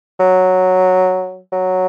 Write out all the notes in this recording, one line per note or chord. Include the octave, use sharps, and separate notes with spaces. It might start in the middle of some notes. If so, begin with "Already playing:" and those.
F#3
F#3